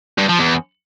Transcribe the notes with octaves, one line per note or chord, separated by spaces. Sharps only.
G2
F3
E2